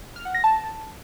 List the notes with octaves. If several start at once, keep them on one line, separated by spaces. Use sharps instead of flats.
F6
F#5
A#6
A5